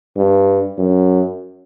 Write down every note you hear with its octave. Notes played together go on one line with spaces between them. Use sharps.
G2
F#2